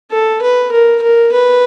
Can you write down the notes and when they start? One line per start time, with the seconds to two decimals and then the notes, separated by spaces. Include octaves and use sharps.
0.11 A4
0.42 B4
0.72 A#4
1.02 A#4
1.32 B4